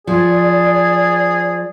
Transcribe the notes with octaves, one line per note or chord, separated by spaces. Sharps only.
F3 G#4 D5